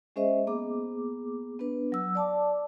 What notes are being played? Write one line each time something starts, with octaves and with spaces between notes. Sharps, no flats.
G#3 C#4 G#4 C5 D#5 E5
A#3 B3 G#4 D6
B3 D4 B4
F#3 E6
D5 A5 D6